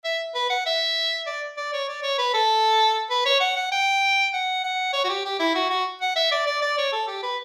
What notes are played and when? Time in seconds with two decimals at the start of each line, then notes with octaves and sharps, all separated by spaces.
0.04 E5
0.35 B4
0.50 F#5
0.66 E5
1.27 D5
1.57 D5
1.73 C#5
1.89 D5
2.03 C#5
2.18 B4
2.34 A4
3.10 B4
3.26 C#5
3.40 F#5
3.56 F#5
3.72 G5
4.33 F#5
4.64 F#5
4.93 C#5
5.04 F#4
5.09 G4
5.25 G4
5.40 E4
5.55 F#4
5.70 F#4
6.01 F#5
6.16 E5
6.32 D5
6.47 D5
6.62 D5
6.78 C#5
6.93 A4
7.08 G4
7.23 B4